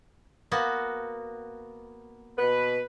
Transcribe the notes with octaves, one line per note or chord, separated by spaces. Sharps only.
A#3 B3 F#4
B2 B4